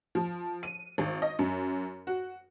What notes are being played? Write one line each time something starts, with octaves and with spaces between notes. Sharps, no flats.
F3
D#7
G#1
D#5
F#2
F#4